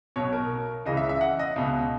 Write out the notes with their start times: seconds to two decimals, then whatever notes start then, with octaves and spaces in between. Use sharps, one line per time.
0.16 B1 B2 C#5
0.33 A#4
0.86 C#2 C#3 E3 D#5
0.97 E5
1.09 E5
1.21 F#5
1.39 D#5
1.56 C#2 B2